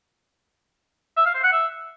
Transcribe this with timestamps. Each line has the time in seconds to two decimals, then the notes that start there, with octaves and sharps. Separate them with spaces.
1.17 E5
1.26 F5
1.34 C5
1.43 F#5
1.52 E5